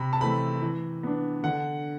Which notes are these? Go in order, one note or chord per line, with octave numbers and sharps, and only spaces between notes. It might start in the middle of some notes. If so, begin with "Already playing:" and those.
Already playing: C3 B5
A5
E3 A3 C4 B5
E3
B3 D4
D3 F#5